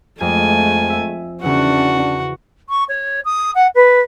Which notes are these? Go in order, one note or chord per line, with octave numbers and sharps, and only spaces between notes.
F2 G#3 A3 G#5
E5
E2 C#3 C#4 D4 F#4 F#5
C#6
C#5
D#6
F#5
B4